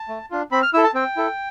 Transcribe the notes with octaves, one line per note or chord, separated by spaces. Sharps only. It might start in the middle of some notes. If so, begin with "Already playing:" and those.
Already playing: A5
A3
D4 F4
C4 B5
F6
E4 A4 E6
A5
C4 G5
E4 A4